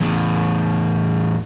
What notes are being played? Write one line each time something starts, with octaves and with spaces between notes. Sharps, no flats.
E2 A2